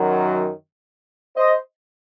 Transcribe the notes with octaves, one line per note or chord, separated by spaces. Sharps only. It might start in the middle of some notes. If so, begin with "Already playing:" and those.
Already playing: F#2 D#3 F#3
C5 D#5